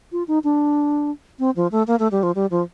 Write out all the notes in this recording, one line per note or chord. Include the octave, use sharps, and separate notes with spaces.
F4
D#4
D4
C4
F3
A3
A#3
A3
G3
F3
G3
F3